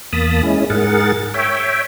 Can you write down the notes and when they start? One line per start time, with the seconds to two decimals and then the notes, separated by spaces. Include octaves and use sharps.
0.13 E2 A#3 A5 B5 D#6
0.43 G#3 C#4 E4
0.70 G#2 G#4 A#4 F#5 A6
1.34 C#5 E5 G5